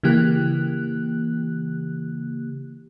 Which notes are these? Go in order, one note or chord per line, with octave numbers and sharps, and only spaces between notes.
C#3 E3 A#3 G4 F#6